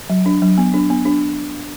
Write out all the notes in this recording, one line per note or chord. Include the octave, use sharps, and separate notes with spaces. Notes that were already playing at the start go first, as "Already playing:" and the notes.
F#3
D4
F#3
B3
D4
B3
D4